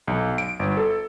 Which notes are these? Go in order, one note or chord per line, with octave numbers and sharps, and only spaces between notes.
B1
D7
G1
A4